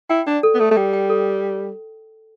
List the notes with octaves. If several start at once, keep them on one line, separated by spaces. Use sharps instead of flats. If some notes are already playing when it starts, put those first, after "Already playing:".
E4 G5
D4 D5
A4
B3
A3 A4
A3
G3 G5
G5
A4